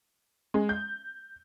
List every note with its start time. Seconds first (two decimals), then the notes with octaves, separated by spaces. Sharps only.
0.54 G#3
0.69 G6